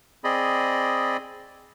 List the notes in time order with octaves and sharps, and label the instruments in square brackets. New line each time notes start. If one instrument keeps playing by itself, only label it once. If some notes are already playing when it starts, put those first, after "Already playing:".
[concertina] C4 G#4 D5 D#5 B5